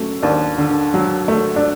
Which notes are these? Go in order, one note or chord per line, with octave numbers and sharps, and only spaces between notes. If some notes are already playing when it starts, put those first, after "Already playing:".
Already playing: F#3 A3 C#4
D#2 D4
D3
F#3
A3
D4